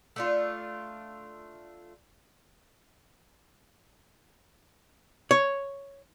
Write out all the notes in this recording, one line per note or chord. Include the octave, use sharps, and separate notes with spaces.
A3 D4 F4
C#5